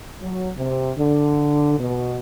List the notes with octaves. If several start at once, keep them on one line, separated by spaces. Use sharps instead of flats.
F#3
C3
D3
B2